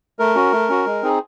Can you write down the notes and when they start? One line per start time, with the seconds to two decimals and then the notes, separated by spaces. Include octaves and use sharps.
0.19 A3 A#4
0.35 C#4 F#4
0.52 A3
0.69 C#4 F#4
0.86 G#3
1.02 C4 D#4 G#4